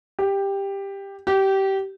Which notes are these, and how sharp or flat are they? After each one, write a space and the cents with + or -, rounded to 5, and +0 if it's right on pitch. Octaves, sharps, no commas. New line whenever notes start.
G4 +10
G4 -20